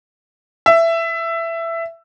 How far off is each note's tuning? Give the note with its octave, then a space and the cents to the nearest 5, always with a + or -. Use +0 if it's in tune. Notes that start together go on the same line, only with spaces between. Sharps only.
E5 +15